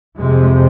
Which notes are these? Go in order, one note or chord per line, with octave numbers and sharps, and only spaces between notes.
F2 C3 G#3